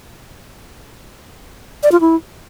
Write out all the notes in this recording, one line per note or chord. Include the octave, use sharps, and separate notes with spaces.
D5
F4
E4